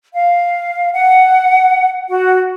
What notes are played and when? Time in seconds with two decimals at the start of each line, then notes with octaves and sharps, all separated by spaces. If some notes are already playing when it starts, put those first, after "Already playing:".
0.14 F5
0.93 F#5
2.08 F#4